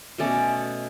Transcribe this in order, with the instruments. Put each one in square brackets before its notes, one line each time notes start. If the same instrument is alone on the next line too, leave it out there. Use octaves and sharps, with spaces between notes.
[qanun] B2 A3 C#4 D5